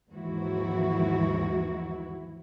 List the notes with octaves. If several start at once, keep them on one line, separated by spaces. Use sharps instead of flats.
D#2 G#2 E3 F3 E4 F#4